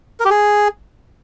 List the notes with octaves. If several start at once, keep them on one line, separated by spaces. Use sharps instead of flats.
A#4
G4
G#4